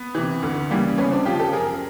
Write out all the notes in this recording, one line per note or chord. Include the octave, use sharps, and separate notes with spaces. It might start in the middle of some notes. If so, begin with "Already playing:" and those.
Already playing: B3
C3 E3
D2
C#3 E3 G3 A#3
C#2 B3 C#4
C4 D4
C#3 F3 F4 G4
G4 A4
F#2 G#4 A#4